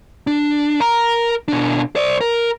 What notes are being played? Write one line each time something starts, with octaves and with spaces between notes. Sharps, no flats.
D4
A#4 A#5
B2 D4
C5 D5
A#4